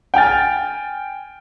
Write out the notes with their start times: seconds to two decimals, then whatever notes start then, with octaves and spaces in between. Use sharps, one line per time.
0.14 G5 G#5 F6 A6